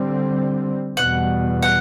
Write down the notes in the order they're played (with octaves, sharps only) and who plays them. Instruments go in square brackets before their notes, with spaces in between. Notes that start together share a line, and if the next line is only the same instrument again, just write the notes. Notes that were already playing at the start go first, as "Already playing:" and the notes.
Already playing: [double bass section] D3 G3 C4
[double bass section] E2 B2 G3 [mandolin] F#5
[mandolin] F#5